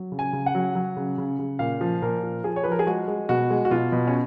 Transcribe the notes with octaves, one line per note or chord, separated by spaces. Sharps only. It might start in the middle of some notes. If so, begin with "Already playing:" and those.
Already playing: F#3
C#3
G#5
C#3
F#5
F#3
F#3
C#3
C#3
C#3
A#2 F5
F3
A#2 A#4
F3
F3 G#4
C#5
F3 B4
A#4
G#4
G#3 F#4
G#3
B2 F#4
G#3
F#4
B2 F4
B2
C#4